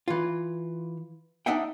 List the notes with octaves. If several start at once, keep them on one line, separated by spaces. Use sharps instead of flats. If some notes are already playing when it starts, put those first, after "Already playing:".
E3 F4
D4 D#4 D#5 E5 F#5 G5